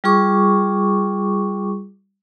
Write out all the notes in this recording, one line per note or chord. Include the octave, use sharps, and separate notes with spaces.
G3 F4 G#4 C#6 D6